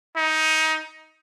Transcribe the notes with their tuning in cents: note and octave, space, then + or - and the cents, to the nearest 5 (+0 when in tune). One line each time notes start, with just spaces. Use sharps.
D#4 +20